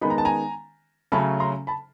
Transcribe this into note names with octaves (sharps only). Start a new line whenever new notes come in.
D#3 G#3 B3 D#4 B5
A#5
A5
G#5 A#5
C#3 F#3 A3 C#4 A5 B5
A#5 C6
A5 B5